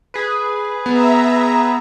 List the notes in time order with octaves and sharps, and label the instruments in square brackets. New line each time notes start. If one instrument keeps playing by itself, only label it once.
[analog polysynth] G#4 B4
[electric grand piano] B3 [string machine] E5 A#5